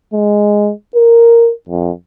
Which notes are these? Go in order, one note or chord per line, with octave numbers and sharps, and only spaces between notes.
G#3
A#4
F2